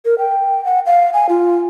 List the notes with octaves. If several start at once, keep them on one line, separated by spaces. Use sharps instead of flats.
A#4
G5
F#5
F5
G#5
F4